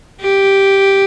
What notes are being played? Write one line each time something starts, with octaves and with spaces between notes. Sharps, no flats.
G4